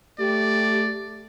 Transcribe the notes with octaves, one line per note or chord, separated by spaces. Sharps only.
A3 G4 D5